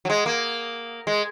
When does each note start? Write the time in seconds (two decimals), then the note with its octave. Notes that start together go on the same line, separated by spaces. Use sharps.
0.05 F#3
0.10 G#3
0.26 A#3
1.07 G#3